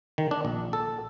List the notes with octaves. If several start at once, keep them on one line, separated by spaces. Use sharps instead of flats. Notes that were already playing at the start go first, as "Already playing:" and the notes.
D#3
D4
A#1
A4